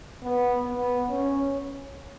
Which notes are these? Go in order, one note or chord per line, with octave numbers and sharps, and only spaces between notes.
B3
B3
C#4